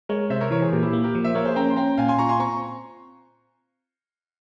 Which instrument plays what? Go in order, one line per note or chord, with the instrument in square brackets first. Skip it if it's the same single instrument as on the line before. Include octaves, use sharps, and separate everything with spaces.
[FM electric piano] G#3 [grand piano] A#4 C#5
[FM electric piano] C3 [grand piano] C5 E5
[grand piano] A#4 C#5
[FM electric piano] E3 [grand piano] A#4 C#5
[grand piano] G#4 C5
[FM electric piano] A#2 [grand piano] G4 A#4
[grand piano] E4 G4
[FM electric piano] A#3
[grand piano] G4 A#4
[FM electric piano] F3
[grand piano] C5 E5
[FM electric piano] A#3 [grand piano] A#4 C#5
[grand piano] G#4 C5
[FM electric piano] C#4 [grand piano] G5 A#5
[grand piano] C6
[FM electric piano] C#4 [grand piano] G5 A#5
[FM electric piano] A#2 [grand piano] F5 G#5
[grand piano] G#5 C6
[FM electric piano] F4 [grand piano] A#5 C#6
[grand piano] G#5 C6
[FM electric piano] C4 [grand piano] A#5 C#6